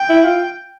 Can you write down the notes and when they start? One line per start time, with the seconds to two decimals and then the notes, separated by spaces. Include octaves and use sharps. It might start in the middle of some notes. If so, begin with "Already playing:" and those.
Already playing: G5
0.09 E4
0.25 F4